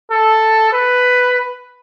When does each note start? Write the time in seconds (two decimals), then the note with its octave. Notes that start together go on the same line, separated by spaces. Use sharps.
0.11 A4
0.72 B4